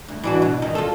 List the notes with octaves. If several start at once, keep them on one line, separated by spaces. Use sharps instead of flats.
D2
E3 D4 F#4
B2
D#3
F4 A4